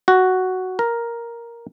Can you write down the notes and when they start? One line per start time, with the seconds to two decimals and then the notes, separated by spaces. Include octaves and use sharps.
0.08 F#4
0.79 A#4